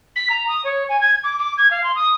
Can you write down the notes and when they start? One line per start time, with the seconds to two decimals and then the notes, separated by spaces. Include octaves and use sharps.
0.16 B6
0.29 A#5
0.48 D#6
0.64 C#5
0.89 G#5
1.01 G#6
1.24 D6
1.38 D6
1.57 G#6
1.70 F5
1.83 C6
1.95 D#6